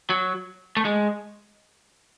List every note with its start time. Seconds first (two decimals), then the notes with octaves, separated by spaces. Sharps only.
0.10 F#3
0.77 A3
0.85 G#3